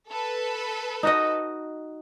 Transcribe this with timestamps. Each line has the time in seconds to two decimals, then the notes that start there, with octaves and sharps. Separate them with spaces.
0.10 A4 B4
1.03 D#4 F#4 D#5